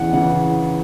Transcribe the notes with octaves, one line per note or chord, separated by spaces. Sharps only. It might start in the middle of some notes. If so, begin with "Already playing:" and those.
Already playing: E2 C#3 E3 F#5
C#3 E3 F#5